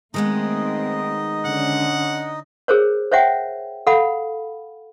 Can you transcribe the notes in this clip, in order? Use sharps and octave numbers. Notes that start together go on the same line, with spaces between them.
D#3 G#3 A3 B3 C4 D#4 D#5
D3 C#4 F#5
G#4 A#4 C5 C#5
C5 C#5 E5 F#5 G5
A4 F5 F#5 B5